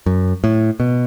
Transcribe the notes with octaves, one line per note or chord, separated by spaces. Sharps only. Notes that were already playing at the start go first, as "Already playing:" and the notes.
F#2
A2
B2